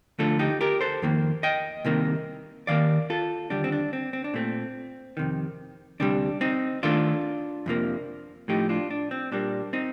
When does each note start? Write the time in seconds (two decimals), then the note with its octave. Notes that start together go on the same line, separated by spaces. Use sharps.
0.19 D2 D3 F3 A3 F4 A4
0.39 D#4 G4
0.61 G4 A#4
0.81 A4 C5
1.02 F2 D#3 A#3
1.43 D#5 G5
1.85 C2 C3 D#3 A#3
2.67 D#2 D#3 A#3 D5 F5
3.10 F4 A4
3.50 D#2 D3 G3 D4
3.64 C4
3.72 D4
3.93 C4
4.13 C4
4.24 D4
4.34 A#2 A3 C4
5.17 F2 C3 D#3
6.00 D2 C3 G3 D4
6.41 C4 D#4
6.83 D#2 D#3 A3 D4 F4
7.66 F2 C3 F3 A#3
8.48 A2 F3 A3 D#4 G4
8.69 D4 F4
8.90 D4
9.11 C4
9.32 A#2 G3 A#3 D4
9.73 C4 D#4